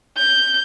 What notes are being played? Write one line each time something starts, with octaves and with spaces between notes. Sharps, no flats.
G6